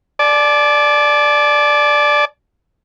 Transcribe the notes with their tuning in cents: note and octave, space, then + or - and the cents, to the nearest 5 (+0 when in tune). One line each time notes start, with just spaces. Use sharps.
D5 +0 A5 -40